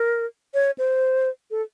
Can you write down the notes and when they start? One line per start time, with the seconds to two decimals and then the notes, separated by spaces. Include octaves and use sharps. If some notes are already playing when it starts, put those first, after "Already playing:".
Already playing: A#4
0.54 C#5
0.78 C5
1.51 A4